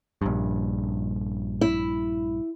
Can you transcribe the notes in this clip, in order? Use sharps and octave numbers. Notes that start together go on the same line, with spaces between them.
A#1 G2
E4